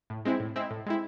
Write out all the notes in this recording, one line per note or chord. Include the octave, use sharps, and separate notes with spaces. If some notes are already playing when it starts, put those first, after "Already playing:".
A2
G#3 C4 E4
A2
G#3 C4 E4
A2
G#3 C4 E4